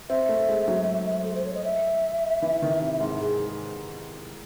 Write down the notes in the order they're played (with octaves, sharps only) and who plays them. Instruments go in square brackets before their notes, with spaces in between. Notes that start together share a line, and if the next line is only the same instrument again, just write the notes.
[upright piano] C4 [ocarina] E5
[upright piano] A3
G#3
F#3
[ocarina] A4
C5
C#5
D#5
E5
[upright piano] E3
D#3
C3
G#2
[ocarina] G#4